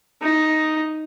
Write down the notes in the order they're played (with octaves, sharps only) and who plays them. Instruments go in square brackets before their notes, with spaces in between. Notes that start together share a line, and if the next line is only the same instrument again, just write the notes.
[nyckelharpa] D#4